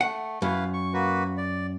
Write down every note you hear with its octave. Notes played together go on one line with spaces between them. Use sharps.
A3 F#5
F#2 E4 B4 F5
C#6
A#3 F#4 B4
D5